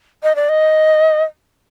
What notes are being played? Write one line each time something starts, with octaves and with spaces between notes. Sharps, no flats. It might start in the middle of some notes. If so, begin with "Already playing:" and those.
D#5
D5
D#5